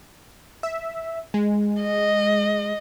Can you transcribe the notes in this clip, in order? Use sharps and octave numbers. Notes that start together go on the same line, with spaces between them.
E5
G#3
D#5